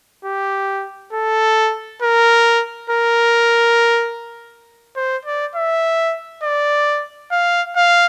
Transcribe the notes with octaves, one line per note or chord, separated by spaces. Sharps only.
G4
A4
A#4
A#4
C5
D5
E5
D5
F5
F5